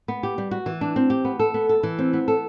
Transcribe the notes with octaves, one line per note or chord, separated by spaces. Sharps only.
B3
G4
G3
F#4
E3
D4
C4
G4
B3
A4
B3
A4
E3
C4
B3
A4